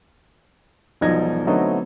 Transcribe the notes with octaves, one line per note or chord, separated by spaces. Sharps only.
E1 B1 F3 D#4 G#6 A#6
D3 F#3 A3 B3 C4 D#4